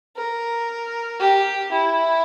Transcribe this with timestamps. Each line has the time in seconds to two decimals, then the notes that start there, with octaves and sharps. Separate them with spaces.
0.16 A#4
1.20 G4
1.72 E4